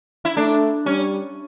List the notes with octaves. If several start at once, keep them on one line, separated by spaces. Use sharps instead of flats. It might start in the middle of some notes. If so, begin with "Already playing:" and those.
E4
A3 D4
G3 C#4